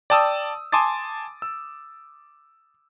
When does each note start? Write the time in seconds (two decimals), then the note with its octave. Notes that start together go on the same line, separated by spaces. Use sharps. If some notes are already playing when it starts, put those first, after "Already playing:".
0.10 D5 G5 A5 D#6 E6
0.72 G#5 A5 C6 D6 D#6 A6
1.42 E6